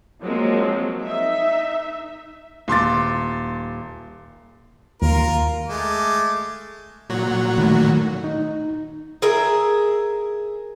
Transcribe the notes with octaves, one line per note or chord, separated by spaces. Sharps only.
F3 F#3 G#3 A#3 C4
D#4 E5
D#1 C6 D6 A6
D#2 F4 A#4
G#3 A3 D6
A#2 F#3 F#4
A2 D#3 A3
D#4
G#4 A#4 E5